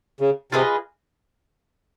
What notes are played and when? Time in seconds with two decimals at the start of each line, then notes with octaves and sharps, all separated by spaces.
0.21 C#3
0.52 C3 F4 G#4 B4 D#5